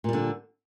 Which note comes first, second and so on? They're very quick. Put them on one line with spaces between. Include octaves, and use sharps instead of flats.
A#2 G3 D3